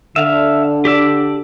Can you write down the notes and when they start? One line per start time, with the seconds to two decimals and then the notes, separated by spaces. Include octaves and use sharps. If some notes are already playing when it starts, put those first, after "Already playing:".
0.16 D3 E5 F5
0.85 G4 D5 E6